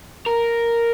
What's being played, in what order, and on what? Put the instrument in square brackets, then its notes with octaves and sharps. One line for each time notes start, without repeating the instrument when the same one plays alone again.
[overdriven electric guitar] A#4